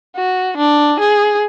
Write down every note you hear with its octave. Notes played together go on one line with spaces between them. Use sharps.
F#4
D4
G#4